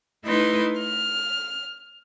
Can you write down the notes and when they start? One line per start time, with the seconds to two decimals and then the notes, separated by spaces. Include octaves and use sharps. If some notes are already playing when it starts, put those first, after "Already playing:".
0.25 A3 D#4 E4 B4 C6
0.80 F6